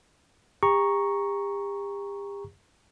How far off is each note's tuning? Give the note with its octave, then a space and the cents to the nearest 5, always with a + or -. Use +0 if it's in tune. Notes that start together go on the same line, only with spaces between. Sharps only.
G4 +40 A#5 +0 C#6 +0